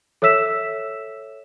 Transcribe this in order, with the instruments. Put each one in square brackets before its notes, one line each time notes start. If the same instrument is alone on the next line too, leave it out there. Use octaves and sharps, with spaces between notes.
[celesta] A4 C#5 E5 E6 B6 E7